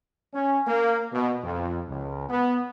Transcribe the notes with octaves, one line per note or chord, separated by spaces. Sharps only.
C#4
A#3
B2
F2
C#2
B3